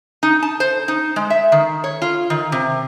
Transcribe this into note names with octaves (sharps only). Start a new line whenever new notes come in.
D#4
A5
C5
D#4
G#3
E5
D#3
C#5
F4
D#3
C3